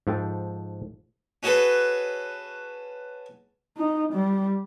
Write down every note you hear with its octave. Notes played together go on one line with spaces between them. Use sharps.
G#2 F3 A4 G5 A5
C#4 F#4 G#4 A4 B4
D#4
G3